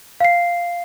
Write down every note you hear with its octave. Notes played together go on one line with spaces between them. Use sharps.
F5 C7